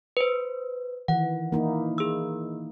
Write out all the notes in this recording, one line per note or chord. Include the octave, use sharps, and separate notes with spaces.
B4 C5
D#3 E3 F#5
A#3 D#4 E4
G#4 E6